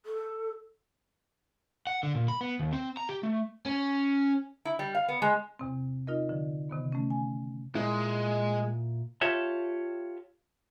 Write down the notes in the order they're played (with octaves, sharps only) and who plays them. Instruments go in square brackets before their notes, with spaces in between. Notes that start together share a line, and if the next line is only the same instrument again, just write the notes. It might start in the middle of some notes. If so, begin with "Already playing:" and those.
[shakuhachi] A4
[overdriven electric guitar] F#5
D3
A#2
B5
B3
D#2
C4
A#5
G4
A3
C#4
[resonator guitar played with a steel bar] E4
G3
F5
B3
G#3
[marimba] E2 C3 C4
D#4 F4 A#4 D#5
D3 F3
C3 D#3 B3
A3 C#4
G#5
[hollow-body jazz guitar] A#2 E4 [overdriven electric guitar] G#3
[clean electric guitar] F4 G4 A4 C#5 E5